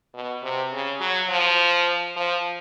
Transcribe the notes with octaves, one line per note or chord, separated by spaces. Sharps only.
B2
C3
C#3
F#3
F3
F3